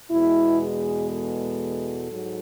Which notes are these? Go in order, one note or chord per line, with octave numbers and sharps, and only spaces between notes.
E2 B2 G#3 B3 E4
G#4
A4
G#2 F#3